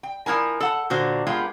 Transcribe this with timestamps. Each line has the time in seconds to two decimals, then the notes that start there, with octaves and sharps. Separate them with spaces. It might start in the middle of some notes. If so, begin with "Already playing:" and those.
0.03 G5
0.26 F3 A#3 E4 A#4 G#5
0.60 A4 F#5 A5
0.90 A#2 D3 F#4 C5
1.27 G#3 A#3 B3 F4 G4